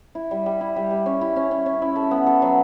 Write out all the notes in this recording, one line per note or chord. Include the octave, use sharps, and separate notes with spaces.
E4
G3
G3
E4
G3
G3
C#4
E4
C#4
C#4
C#4
E4
A4
B3
A4
F#3